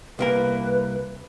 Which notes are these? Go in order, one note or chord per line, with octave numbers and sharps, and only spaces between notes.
C2 A#3 A#4 B4